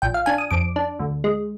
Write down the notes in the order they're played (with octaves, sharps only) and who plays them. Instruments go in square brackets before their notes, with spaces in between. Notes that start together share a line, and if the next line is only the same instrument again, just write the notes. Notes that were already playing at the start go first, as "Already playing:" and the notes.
[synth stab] A#1 G5
F5
D4 G#5
D#6
F2 D6
D4
D2
G#3